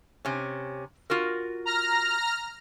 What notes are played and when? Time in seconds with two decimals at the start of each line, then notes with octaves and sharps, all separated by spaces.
0.25 C3 C#4
1.10 F4 F#4 A#4
1.65 A#5 F6 A#6